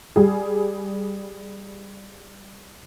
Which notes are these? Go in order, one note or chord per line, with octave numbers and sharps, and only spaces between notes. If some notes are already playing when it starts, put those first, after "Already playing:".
G3 G#4